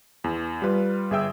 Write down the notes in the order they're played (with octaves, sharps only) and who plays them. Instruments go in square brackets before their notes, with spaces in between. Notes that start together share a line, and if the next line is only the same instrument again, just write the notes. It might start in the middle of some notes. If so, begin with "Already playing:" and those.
[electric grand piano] E2
G3 F4 B4
G1 G#4 E5 G5 E6